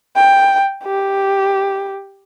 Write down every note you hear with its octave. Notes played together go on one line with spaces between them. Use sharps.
G5
G4